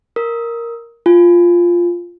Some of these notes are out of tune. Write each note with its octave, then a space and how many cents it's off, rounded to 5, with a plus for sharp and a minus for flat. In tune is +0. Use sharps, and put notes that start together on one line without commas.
A#4 +0 D#6 +30
F4 +0 G#5 +0